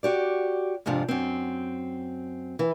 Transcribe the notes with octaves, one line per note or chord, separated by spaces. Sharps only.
F#4 G4 D5
F2 G#2 C3 F3 D4
F#2 C4
E3